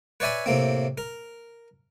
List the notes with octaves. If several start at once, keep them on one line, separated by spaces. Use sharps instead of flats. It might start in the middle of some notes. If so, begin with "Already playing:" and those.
B4 C#5 D5 E5 G#5 B5
A2 C3 A#3 C4
A#4